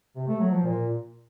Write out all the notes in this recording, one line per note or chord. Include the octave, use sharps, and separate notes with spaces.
C3
A3
F#3
F3
A#2